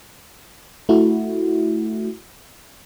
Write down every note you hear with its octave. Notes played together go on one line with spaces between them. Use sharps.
A3 E4 F#4